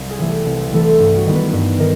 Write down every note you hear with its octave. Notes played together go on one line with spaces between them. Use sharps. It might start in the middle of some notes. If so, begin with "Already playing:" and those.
Already playing: C2
G#4
C3 E3 A3
G4
C2
C3 E3 A3 A4
G2 G4
F#4
D#3 G3 B3
B4
G2 B4
D#3 A#4